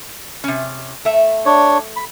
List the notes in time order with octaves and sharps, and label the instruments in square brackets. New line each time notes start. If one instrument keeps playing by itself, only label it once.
[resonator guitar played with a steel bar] C3 C#4
A3 E5
[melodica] D4 C#5
B5